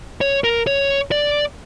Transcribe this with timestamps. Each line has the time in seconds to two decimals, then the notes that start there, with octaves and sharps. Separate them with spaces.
0.21 C#5
0.44 A#4
0.67 C#5
1.11 D5